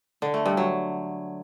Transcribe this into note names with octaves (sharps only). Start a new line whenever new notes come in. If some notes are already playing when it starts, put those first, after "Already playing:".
D3
A3
G2
F#3